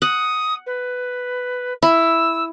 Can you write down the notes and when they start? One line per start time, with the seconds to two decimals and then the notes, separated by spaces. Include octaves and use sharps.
0.02 F#5 D#6
0.66 B4
1.82 E4 E6